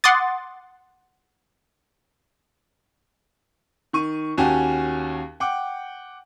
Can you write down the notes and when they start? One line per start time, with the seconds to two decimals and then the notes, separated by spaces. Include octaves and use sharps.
0.04 F#5 C6 D6 D#6 A6
3.93 D#3 C#6 D#7
4.38 D#2 C#4 F#4 G4 G#5 A5
5.40 F#5 G5 D6